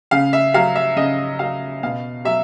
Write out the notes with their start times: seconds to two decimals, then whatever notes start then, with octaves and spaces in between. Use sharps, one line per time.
0.11 C#3 F5
0.33 E5
0.54 F#3 F5
0.76 E5
0.96 C#3 D#5
1.39 F#3 F5
1.83 B2 F5
2.25 F#3 E5